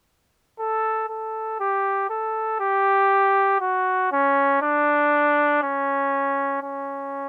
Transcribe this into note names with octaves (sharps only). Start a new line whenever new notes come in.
A4
A4
G4
A4
G4
F#4
C#4
D4
C#4
C#4